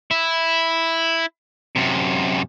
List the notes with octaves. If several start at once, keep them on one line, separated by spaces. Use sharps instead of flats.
E4
F#2 C3